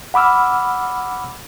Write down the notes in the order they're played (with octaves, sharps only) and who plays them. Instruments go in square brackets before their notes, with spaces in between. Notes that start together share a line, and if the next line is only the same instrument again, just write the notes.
[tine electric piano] F#5 B5 D6 E6 F6